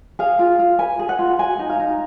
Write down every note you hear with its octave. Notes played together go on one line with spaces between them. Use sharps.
G#4 F5
F4
F4
B4 G#5
G#4
F#5
F4
F#4 G#5
D#4
F5
D#4